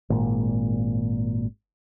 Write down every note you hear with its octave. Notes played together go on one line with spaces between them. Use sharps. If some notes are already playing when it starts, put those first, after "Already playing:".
G#1 A#2